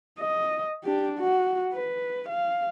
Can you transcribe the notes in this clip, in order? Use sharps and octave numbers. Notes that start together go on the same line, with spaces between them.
D#5
D4 G4
F#4
B4
F5